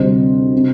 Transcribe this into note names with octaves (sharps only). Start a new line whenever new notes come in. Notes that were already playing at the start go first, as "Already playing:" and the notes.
Already playing: D2 C3 G3 C5 D#5
C3